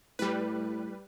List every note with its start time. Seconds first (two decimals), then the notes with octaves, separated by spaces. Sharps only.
0.19 A2 G3 B4